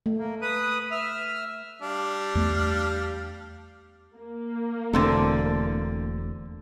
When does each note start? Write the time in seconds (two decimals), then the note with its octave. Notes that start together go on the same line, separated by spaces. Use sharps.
0.06 A3
0.18 A#3
0.42 B4 D#6
0.91 E5 F6
1.82 G3 D4 F5
2.35 E2 A3
4.16 A#3
4.93 E1 D3 A3 C4 A4